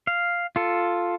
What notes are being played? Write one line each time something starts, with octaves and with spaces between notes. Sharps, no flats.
F5
F4 A4